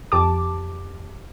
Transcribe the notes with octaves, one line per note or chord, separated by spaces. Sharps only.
F2 G4 A5 D6